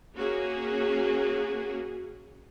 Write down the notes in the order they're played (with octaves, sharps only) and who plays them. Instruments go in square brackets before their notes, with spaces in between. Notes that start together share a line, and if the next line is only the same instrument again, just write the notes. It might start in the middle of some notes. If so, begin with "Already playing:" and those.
[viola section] A#3 C#4 F#4 G#4